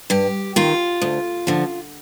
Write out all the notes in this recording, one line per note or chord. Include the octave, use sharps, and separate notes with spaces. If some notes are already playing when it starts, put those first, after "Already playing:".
G2 G4
D#3 F4
D2
D3 F3